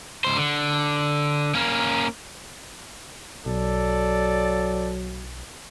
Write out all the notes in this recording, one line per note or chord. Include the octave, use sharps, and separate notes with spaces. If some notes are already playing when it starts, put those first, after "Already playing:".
C#2 C5
D3
A#3 C#4
B1 F#3 A4 D5